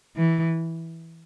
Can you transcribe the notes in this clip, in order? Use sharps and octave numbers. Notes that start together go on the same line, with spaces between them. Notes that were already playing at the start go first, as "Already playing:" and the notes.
E3